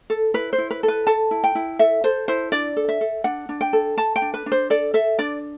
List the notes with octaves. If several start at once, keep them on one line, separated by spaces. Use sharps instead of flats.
A4
E4 B4
C5
E4
B4
A4
B4
A4 A5
E4
G5
E4
A4 E5
A4 C5
E4 C5
D4 D5
A4
E5
A4
D4 F#5
D4
G5
A4
A4 A5
G5
D4
B4
D4
C5
A4 D5
A4 E5
D4 D5